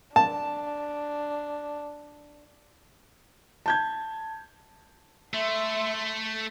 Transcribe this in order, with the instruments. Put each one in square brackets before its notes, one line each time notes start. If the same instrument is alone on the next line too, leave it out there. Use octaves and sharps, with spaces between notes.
[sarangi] D4 [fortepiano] A5
[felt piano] A5 G6 G#6
[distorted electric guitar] A3 [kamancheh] E5 C6